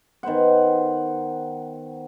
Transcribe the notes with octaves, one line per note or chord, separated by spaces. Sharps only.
D#3 B3 C5 F#5